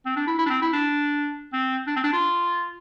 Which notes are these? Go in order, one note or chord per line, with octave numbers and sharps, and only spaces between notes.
C4
D4
E4
E4
D4
C4
E4
D4
C4
D4
C4
D4
F4